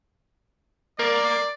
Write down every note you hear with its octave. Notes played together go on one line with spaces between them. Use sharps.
A#3 A#4 D5